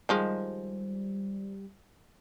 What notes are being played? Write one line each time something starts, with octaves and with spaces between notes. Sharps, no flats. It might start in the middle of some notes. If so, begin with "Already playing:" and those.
D#3 F3 G3 G#3